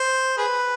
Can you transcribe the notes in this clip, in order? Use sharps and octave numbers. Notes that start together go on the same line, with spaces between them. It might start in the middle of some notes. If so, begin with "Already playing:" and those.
Already playing: C5
G#4 B4